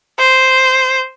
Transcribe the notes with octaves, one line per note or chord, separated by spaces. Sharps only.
C5